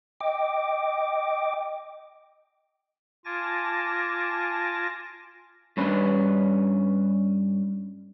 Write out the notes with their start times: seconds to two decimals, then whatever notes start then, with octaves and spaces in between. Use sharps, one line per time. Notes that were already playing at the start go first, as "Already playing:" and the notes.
0.21 D#5 G5 D6
3.25 F4 G#5 A5 D6 A#6
5.77 G2 C#4 B4